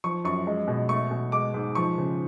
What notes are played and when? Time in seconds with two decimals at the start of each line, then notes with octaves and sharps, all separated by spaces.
0.04 F3 C#6
0.24 F#2 C#6
0.47 G#3
0.67 B2
0.89 A3 C#6
1.11 B2
1.32 G#3 D6
1.54 G#2
1.75 F3 C#6
1.98 C#3